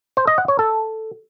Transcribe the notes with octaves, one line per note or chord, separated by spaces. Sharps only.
C5
D#5
F#5
C#5
A4